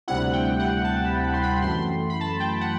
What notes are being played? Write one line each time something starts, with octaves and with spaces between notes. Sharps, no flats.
D2 C3 G3 C4 E4 F#5
F#5
G5
F#5
A5
B5
B5
C6
B5
F#2 E3 A3 C6
C6
B5
A5
G5
F#5